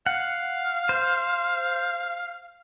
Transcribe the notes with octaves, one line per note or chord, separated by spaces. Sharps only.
F5 F#5
C5